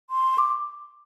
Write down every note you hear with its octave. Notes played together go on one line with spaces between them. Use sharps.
C6
D6